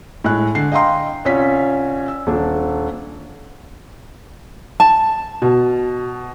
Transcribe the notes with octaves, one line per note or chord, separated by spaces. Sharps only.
A2 G#3 F#6
D3 C7
D#5 F5 G5 A#5 C6
C2 C#4 F4 C#5 G#5 B6
E6
D#1 D4
A5
B2